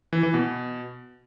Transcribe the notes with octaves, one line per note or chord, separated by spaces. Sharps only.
E3
E3
B2